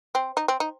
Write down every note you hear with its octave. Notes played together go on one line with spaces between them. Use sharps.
C4
D#4
C4
D#4